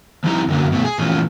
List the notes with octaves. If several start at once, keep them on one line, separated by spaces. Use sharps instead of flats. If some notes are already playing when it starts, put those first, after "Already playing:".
F3 G3 C4 D#4 E4 A#5
F#2 D3 F#3 A#3
B2 A3
G#4
A#2 E3 F3 A3 C#4 F4